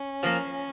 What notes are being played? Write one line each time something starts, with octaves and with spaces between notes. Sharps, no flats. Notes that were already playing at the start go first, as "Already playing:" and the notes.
Already playing: C#4
F3 A#3